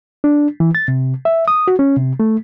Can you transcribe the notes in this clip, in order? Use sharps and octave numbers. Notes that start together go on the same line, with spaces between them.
D4
E3
A6
C3
E5
D#6
F#4
C#4
C3
A3